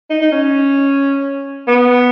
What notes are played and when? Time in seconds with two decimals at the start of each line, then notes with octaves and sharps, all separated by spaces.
0.10 D#4
0.21 D#4
0.32 C#4
1.68 B3